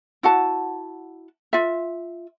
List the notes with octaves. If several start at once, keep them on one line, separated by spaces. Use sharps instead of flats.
E4 F#4 F#5 A5
F4 E5